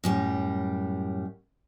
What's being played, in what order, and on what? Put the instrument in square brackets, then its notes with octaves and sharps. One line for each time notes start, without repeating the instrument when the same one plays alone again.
[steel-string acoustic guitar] F#2 A2 G3